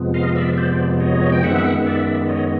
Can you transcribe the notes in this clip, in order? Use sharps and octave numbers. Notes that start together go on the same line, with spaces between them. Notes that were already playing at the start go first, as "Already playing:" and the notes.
Already playing: F2 C3 F3 G#3 B3
D#5 F5
D5 E5
C5 D5
C#5 D#5
G5
F#2 D#3 G#3 B3 E5 F#5
D5 E5
C#5 D#5